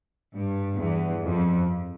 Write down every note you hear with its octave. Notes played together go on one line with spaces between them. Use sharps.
G2
E2
F2